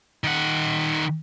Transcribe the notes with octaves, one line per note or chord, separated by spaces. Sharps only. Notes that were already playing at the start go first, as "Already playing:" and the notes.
D#3 F#5